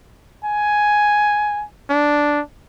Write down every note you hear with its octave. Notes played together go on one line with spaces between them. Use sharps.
G#5
D4